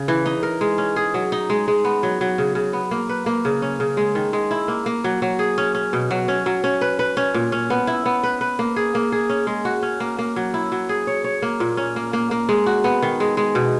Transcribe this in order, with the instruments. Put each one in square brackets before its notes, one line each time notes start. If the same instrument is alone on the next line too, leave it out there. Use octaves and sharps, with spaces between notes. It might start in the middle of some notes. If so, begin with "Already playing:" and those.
Already playing: [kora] C#3
E3
D#4
A#4
G#3
C#4
G#4
F#3
D#4
G#3
G#3
B3
F#3
F#3
C#3
C#3
B3
A#3
B4
A#3
C#3
C#4
C#3
G#3
D#3
G#3
E4
A#3
A#3
F#3
F#3
G#4
C#4
C#4
B2
F#3
C#4
F#3
C#4
B4
B4
C#4
A#2
C#4
B3
E4
B3
B4
B4
A#3
G#4
A#3
G#4
C#4
G#3
F#4
C#4
A#3
A#3
F#3
E4
F#3
G#4
C#5
C#5
A#3
A#2
C#4
A#3
A#3
A#3
G#3
F#4
B3
D#3
G#3
G#3
B2